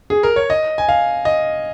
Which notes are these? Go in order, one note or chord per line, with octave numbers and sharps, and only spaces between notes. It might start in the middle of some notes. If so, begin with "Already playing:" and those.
G#4
A#4
C#5
D#5
G#5
F5
D#5